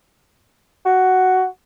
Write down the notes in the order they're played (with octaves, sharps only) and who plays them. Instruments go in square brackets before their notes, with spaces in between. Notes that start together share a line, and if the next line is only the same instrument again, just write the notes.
[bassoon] F#4